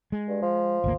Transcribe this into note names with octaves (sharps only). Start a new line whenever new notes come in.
G#3
G2
F3
G#1 D2 A#3